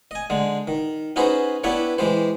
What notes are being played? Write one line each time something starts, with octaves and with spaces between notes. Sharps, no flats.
D#5 G#5
D3 G#3
D#3
C#4 D#4 F#4 G#4 B4 C5
B3 D4 E4 G4 B4 C#5
E3 G#3 G4 C5